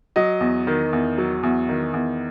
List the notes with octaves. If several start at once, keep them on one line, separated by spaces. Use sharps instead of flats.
F#3 D#5
E2
D#3
E2
F#3
E2
D#3
E2